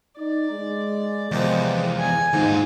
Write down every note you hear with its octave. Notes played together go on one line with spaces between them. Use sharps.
D#4 D5
G#3
E2 C3 D#3 F3 G#3
G#5
D#2 G#2 D#4 F4